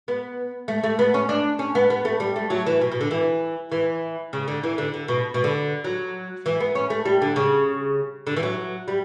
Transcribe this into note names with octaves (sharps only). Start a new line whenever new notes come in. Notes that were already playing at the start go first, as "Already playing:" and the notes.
B3
A3
A3
B3
C#4
D4
C#4
B3
B3
A3
G3
A3
F#3
E3
B2
B2
D3
E3
E3
C#3
D3
E3
D3
D3
B2
B2
D3
F#3
E3
B3
C#4
A3
G3
D3
C#3
D3
E3
F#3
G3